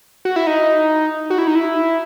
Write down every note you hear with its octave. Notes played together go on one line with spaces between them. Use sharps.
F#4
E4
D#4
F#4
E4
D#4
E4